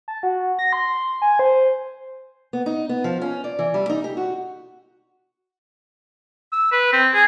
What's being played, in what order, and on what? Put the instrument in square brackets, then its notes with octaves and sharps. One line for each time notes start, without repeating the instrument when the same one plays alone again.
[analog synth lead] A5
F#4
A#6
C6
G#5
C5
[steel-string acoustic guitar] B3
D#4
B3
F3
C#4
D5
E3
G3
D#4
G4
F#4
[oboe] E6
B4
C4
G#4